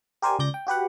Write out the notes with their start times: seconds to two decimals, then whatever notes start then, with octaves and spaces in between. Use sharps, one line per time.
0.22 G4 A#4 C5 D5 G#5
0.39 C#2 D5 G6 A#6
0.54 G5
0.67 F#4 G4 B4 F#5